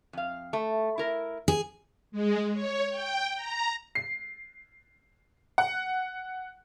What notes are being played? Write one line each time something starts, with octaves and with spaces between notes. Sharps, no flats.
F2 F5
A3
E4 A#4
G#4
G#3
C#5
G5
A#5
C7
F#5